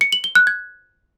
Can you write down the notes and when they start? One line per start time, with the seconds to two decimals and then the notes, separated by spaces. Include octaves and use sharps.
0.01 C#7
0.12 F#7
0.24 G7
0.35 F#6
0.47 G#6